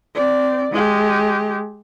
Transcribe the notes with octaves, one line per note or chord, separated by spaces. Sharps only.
C4 D5
G#3 G4